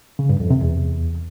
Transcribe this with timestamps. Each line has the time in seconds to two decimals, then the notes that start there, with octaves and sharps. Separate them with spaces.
0.19 C#3
0.30 G2
0.40 F2
0.51 C3
0.61 E2